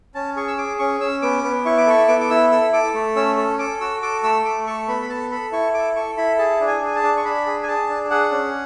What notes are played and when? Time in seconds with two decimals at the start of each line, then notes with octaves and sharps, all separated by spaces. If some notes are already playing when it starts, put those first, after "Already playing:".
0.15 C#4 A5
0.36 G#4 C#6
0.48 E6
0.58 G#4 D6
0.79 C#4 C#6
1.01 C#4 E6
1.22 B3 D6
1.44 B3
1.65 E4 C#6
1.77 D6
1.87 A4 C#6
2.08 B3 D6
2.20 D6
2.30 E4 E6
2.51 A4 E6
2.73 A4 D6
2.94 A3
3.16 C#4 E6
3.37 A4
3.59 A4 D6
3.81 F#4 E6
4.02 A4 D6
4.23 A3 E6
4.45 A3 D6
4.66 A4 C#6
4.88 B3 B5
5.02 B5
5.09 A4 A5
5.31 A4 B5
5.52 E4 C#6
5.74 A4 D6
5.96 A4 C#6
6.17 E4 B5
6.38 G#4 A5
6.60 D4
6.67 G#5
6.82 G#4 G#5
6.96 A5
7.03 D4
7.17 C#6
7.25 D4 B5
7.46 G#4
7.63 G#5
7.68 G#4 A5
7.89 D4
8.11 G#4 F#5
8.32 C#4